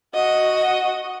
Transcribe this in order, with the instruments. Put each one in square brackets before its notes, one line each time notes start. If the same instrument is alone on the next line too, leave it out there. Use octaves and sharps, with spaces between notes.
[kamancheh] F#4 D#5